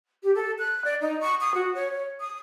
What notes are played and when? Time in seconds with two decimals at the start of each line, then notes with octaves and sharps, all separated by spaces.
0.23 G4
0.34 A4
0.58 F#6
0.84 D5
1.01 D#4
1.20 C#6
1.40 D#6
1.54 F#4
1.74 C#5
1.91 C#5
2.20 D#6